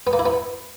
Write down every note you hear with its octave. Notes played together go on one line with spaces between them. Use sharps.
B3
A#3
E4
B3